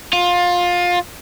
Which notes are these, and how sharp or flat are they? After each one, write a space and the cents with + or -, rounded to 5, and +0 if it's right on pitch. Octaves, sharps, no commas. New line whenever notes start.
F4 +20